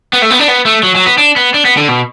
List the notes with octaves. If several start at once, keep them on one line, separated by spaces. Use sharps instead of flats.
B3
A3
B3
D4
B3
A3
F#3
F#3
B3
D4
B3
D4
B3
D3
B2